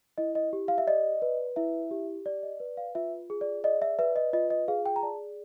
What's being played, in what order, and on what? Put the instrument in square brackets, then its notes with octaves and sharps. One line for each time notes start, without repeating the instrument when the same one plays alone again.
[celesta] E4 D#5
D#5
G4
F5
E5
D5 D#5
B4
E4 E5
G4
D5
D#5
B4
F5
F4 E5
G#4
D5
D5 D#5
E5
B4 E5
D#5
F4 D#5
D#5
G#4 F5
G5
A#5
D5 A5